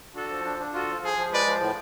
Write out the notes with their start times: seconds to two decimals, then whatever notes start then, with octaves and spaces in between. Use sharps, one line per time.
0.15 D4 F#4 A4
0.29 F3
0.45 D4
0.59 D4
0.73 F4 F#4 A4
0.88 F3
1.02 F3 F4 G#4
1.17 F3
1.31 G#3 B4 D5
1.47 F3
1.61 A2